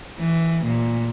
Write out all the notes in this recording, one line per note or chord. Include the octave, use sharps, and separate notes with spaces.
E3
A#2